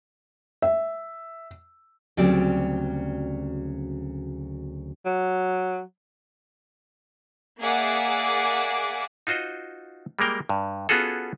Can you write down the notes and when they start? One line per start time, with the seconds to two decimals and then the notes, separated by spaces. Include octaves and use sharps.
0.62 E5
2.17 D2 C#3 F#3 G3 C4 D5
5.05 F#3
7.59 A#3 G#4 D5 E5 F#5 D6
9.27 D#4 F4 F#4 C5 D#5
10.19 G3 G#3 A#3 A#4 G5
10.49 G2
10.89 B3 C#4 F4 F#4 G#4 A4